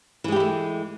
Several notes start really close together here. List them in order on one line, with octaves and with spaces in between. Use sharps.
E3 G#3 G4 E4 A3